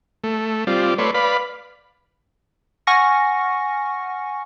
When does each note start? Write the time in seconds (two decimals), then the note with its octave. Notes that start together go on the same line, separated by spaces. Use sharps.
0.24 A3
0.67 G3 C4 F4 D5
0.98 A3 B4 C#5 D5 C6
1.14 B4 D5 F5 B5
2.87 F#5 G#5 C#6 F6 A#6 C#7